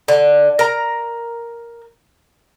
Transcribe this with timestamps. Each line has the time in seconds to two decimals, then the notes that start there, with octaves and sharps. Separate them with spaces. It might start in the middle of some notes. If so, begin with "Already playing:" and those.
0.08 D3
0.59 A#4 A#5